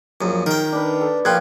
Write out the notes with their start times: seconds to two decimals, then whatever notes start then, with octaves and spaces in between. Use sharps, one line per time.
0.21 A#1 F#2 D#6
0.46 D#3 A#4 G5
0.72 D4 B4
1.01 A4
1.25 A#1 A#2 F4 G5 F#6 G#6